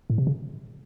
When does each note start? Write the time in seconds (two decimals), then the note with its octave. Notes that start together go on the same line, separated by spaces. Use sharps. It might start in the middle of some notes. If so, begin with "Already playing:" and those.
0.10 A2
0.18 C3
0.27 C#3